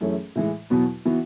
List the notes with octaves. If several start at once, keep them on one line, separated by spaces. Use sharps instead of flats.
F#2 E3 A3 C#4 G#4
A2 E3 G#3
E2 B2 F#3 B3 F#4
E3 B3 F#4